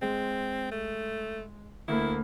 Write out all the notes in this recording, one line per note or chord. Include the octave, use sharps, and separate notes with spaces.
G#3 C4
A3
D2 A#3 E4 B5